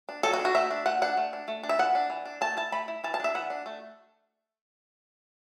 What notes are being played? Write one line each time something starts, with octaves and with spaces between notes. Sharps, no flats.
D4
F#3 A4
F#4
D4
F#4
A3 E5
D4
A3 F#5
D4 F#5
A3
D4
A3
D4
E5
E3 F#5
D4
E3
D4
A3 A5
E4 A5
A3 B5
E4
E3 A5
A5
D4 E5
E3 F#5
D4
A3